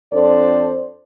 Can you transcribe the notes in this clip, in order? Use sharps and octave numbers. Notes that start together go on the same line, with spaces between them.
F2 D4 A4 C5 D5